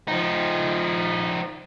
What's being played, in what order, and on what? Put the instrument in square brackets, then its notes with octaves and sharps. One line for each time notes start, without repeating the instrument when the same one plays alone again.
[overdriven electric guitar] F3 D#4